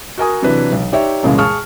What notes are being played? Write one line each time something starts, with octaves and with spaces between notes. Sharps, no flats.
F#4 A#4 G#5 D#6
C3 E3 F#3 D4 B4
B1
D#4 G4 C#5 D5 E5
C2 F#2 A#2 C#3 E3 G#3
G#4 A5 C#6 F6